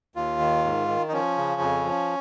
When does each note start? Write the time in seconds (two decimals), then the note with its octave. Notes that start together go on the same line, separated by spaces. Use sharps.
0.16 D#2 F4
0.40 D#3
0.65 G#2
0.88 D#3
1.08 D#4
1.12 F3 C#4
1.37 C#3
1.61 F2
1.85 F3